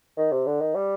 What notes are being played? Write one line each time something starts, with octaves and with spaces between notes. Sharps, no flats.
D#3
C3
D3
D#3
G3